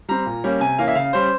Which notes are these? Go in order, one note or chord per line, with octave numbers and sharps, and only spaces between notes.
G3 C4 A#5
A#2
G3 A#3 C#4
C3 G#5
E3 A#3 C#4 F5
E5
C#3 F5
G3 C#4 C5